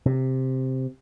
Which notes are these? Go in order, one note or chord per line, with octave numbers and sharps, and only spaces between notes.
C3